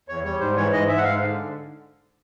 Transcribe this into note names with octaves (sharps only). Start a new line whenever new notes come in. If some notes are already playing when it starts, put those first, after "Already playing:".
E2 C#5
G3 C#5
G#2 C5
E3 C#5
G#2 D#5
G#2 E5
F#5
G#2 F5
D3